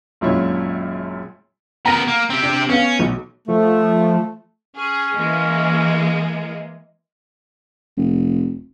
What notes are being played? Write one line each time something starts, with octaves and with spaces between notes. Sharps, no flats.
G#1 F#2 A#2 E4 C#5
B3 A#4 A#5 A#6 D#7
A#3
C4 G4
D4
B3 C#4 F5
B1
F3 A3
C#4 G#4
E3 G#3 A#3
F1